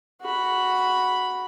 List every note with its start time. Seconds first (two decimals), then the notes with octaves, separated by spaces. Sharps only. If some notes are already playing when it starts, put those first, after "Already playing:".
0.22 F#4 B5